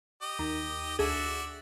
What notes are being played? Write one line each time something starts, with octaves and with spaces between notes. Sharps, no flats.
G4 D#5
D#2
D2 F#4 G#4 D5 E5